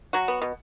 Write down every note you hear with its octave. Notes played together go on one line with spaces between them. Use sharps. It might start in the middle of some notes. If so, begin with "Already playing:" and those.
F#3 F#4
B3
B2